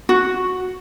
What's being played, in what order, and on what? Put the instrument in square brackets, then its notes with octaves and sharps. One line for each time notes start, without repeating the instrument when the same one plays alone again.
[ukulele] F#4